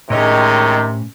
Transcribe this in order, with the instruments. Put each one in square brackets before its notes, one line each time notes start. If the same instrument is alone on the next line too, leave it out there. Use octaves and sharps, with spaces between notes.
[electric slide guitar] A2 C#4 [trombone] C3 [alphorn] D#3 [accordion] G#3 C#5 D#5